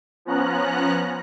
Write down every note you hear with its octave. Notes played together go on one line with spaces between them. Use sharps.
F3 B3 C#4 A#5 F#6